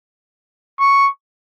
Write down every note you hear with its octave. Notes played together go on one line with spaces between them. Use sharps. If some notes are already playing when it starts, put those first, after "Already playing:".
C#6